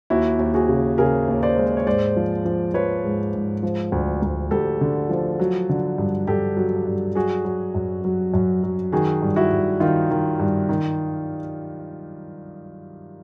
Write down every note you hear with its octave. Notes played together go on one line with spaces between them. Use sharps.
D#2 E4 F#4
D#2
F#4 G#4
C#3
C#3 G#4 A#4
D#2
C5 D5
G#3
C5
C#5
G#2 C5 D5
F3
F3
F3 B4 C#5
G#2
G#2
F3
D2
D2
D2 G4 A4
D3
F3
F#3
D3
G2
G2 G4 A4
F#3
G2
F#3 F#4 G#4
F#3
F#2
F#3
F#2
F#3
D#3 F#4 G#4
G2
E4 F#4
G2
D#3 D#4 F4
D#3
G2
D#3